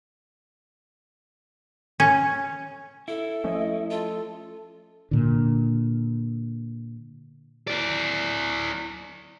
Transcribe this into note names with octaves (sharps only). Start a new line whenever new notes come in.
C#4
E4 A4
F3 A3 C#4 D#5
F4 A4
A#2 D3
E4 D5